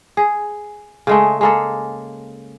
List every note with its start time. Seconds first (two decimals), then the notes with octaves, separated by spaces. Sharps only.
0.17 G#4
1.07 C#3 G#3 A3
1.41 G#3 A#3 A4